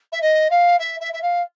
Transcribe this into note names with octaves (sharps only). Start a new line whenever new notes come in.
E5
D#5
F5
E5
E5
E5
F5